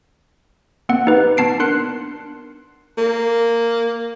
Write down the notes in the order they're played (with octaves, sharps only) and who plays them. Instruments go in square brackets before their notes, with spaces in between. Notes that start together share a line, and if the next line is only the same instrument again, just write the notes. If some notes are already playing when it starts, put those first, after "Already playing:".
[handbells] A#3 C4 F#5
D#4 G4 B4
B3 A5 C7 D7
D4 A#4 C6 F#6 C7 C#7
[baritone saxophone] A#3